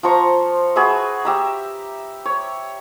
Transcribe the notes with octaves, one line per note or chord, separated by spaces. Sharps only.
F3 C5 A#5 C#6
F#4 G#4 B4 E5
G4 E5 A#5
C#5